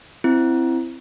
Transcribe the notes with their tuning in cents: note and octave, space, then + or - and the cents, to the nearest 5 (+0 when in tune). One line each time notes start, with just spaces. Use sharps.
C4 +0 E4 +15